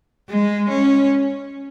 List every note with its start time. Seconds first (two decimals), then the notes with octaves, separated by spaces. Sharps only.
0.29 G#3
0.70 C#4